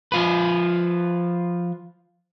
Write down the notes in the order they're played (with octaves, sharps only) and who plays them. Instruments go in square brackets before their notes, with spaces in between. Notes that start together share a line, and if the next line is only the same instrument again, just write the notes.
[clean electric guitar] F3 F4 B4